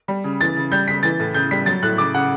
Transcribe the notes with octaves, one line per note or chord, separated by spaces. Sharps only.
G3
C#3
E3 A6
C#3
G3 G6
C#3 B6
E3 A6
A2
C#3 G6
G3 B6
F#3 A6
A2 F#6
C#3 D6
C#3 F#5